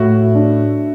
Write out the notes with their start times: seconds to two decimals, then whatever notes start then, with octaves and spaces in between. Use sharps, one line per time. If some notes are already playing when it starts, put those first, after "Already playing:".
Already playing: A2 E4 F#4
0.35 D4